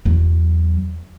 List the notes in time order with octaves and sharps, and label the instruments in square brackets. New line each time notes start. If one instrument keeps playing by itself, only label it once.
[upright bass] E2 F#3